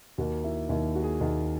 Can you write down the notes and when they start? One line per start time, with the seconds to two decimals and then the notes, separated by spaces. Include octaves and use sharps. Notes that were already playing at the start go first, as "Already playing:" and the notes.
0.18 D#2 D#3 A#3 F#4
0.44 E4
0.69 D#2 D#3 A#3 E4
0.95 F#4
1.03 G#4
1.21 D#2 D#3 A#3